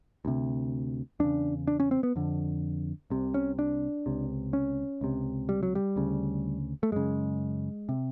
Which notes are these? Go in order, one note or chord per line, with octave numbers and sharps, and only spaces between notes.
D2 C3
E2 C#3 D4
D4
C#4
C4
B3
F2 D3
C2 C3
C#4
D4
C#2 C3
C#4
C#2 C3
G3
F#3
G3
D2 C#3
A3
F#2 C#3 G#3
C3